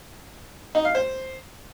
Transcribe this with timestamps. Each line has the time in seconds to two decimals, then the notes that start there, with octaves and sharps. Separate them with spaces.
0.75 D#4
0.85 F5
0.95 C5